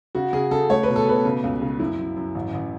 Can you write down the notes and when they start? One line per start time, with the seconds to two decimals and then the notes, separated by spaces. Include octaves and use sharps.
0.15 C#3 F#4
0.33 C#3 G#4
0.51 C#3 A4
0.70 A3 C#5
0.83 B2 B4
0.96 A4
1.06 B2 B4
1.25 C#3
1.44 C#2
1.62 C#3
1.79 F#2 E4
1.98 F#2
2.16 F#2
2.35 A1
2.53 A1